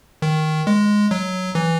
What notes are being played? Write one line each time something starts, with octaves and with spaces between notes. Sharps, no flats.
D#3
G#3
F#3
E3